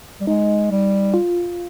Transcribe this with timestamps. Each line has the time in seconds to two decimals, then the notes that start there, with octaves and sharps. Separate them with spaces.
0.20 G3
0.27 G#3 D#4
0.71 G3
1.14 F4